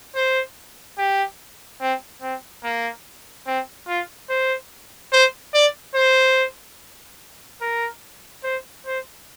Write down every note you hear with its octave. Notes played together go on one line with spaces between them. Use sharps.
C5
G4
C4
C4
A#3
C4
F4
C5
C5
D5
C5
A#4
C5
C5